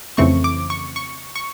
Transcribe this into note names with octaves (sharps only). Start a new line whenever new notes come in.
F2 C#3 E3 A3 C4 C#6
D6
C#6
C#6
C#6